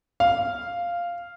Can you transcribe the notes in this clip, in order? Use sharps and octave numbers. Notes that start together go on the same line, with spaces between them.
F5